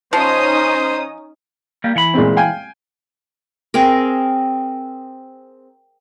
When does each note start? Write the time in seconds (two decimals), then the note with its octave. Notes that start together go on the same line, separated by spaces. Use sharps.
0.13 F3 C#4 D#4 C5 D#6
1.84 G3 A#3
1.96 E3 B5
2.14 A#2 G#3 C4
2.37 F5 G5 G#5
3.74 C4 G#4 A#4